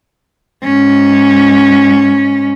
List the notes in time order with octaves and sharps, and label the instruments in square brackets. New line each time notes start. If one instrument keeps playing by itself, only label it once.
[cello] G#2 C#4